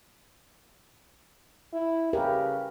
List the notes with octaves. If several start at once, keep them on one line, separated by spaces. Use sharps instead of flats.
E4
C#3 G4 A#4 B4